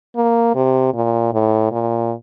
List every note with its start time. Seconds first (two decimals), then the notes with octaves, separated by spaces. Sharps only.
0.16 A#3
0.55 C3
0.94 A#2
1.33 A2
1.71 A#2